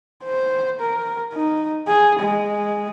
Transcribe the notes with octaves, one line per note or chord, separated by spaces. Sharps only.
C5
A#4
D#4
G#4
G#3